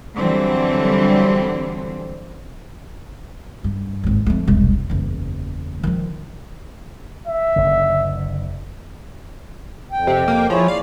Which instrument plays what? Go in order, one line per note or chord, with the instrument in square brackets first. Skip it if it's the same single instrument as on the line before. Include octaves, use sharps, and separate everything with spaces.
[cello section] D3 E3 F#3 G3 C4
[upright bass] G2
G#1 D#2
F2 A3
E1 C2
F#1 E2
D#3 F3
[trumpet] E5
[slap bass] F#1 D3
[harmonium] F2 G5
[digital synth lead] C3
A#3
[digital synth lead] F3 [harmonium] E4 G#4 C#5
[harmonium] D5 [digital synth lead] F5